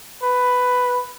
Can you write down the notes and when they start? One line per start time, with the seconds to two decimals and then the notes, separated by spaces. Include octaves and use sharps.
0.23 B4